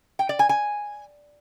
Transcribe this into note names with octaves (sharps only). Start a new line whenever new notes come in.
G5
D5
G#5
G#5